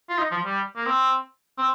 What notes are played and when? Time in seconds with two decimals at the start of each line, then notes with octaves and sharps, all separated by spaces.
0.09 F4
0.18 D#4
0.31 F3
0.45 G3
0.76 A#3
0.86 C4
1.58 C4